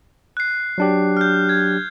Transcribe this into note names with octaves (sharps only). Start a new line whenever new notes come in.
F#6 C7
F#3 D4 G4
F6 G6
G#6